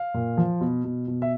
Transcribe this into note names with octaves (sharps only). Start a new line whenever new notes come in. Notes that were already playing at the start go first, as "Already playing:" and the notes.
Already playing: F5
A#2
F3
B2
B2
B2
E5